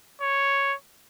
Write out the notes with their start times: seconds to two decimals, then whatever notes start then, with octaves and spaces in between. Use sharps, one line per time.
0.21 C#5